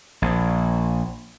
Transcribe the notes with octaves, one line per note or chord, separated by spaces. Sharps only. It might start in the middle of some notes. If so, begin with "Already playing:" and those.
A#1